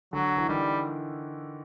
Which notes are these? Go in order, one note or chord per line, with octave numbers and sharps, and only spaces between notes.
D3 F#3
E3
D#3 G3